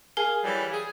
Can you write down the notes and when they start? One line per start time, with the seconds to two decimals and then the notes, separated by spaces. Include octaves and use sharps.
0.17 G#4 A#4 F5
0.44 E3 F#3 G3
0.73 G#4